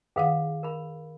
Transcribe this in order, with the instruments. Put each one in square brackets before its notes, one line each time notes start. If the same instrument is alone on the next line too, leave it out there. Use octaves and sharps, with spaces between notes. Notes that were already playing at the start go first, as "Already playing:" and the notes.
[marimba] F#2 D#3 F#5 [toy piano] G#4 B4 F5
[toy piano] A#4 B5